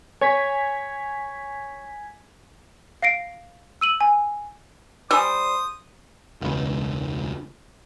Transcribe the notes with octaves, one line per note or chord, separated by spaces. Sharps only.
C#5 G#5 G#6 B6
F5 A#6 C7 D7
E6 D#7 F#7
G#5
G3 C5 G#5 D#6 E6
E1 C#2